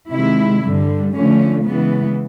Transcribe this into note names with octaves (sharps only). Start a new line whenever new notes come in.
C3 D#3 G#3 E4
G2 D3 G3
D3 F3 A3 C#4
C#3 E3 G#3 B3